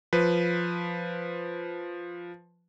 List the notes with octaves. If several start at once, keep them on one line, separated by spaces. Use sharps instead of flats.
F3 B4